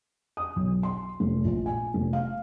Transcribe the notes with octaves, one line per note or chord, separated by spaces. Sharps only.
D#6
B1
C6
F1
A#1
G#5
F1
F5